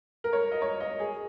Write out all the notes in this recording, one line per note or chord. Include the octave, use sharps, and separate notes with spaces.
A#4
C#5
D#5
C#5
D#5
G#4